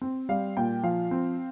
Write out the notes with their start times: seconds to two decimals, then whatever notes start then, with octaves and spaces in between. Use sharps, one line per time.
0.01 C4
0.29 G3 F5
0.57 A#2 G5
0.83 F3 F5
1.11 C4